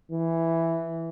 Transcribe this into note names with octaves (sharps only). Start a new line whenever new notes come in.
E3